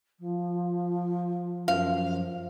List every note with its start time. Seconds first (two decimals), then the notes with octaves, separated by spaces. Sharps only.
0.19 F3
1.68 F#2 F3 F5